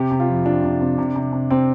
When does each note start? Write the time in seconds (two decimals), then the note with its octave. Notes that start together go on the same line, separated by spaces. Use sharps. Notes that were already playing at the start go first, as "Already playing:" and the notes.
Already playing: C3 G4
0.11 C3
0.20 F4
0.28 F2
0.46 F2 D4
0.63 C3
0.81 C3
0.98 C3
1.16 C3
1.32 C3
1.51 C3 C4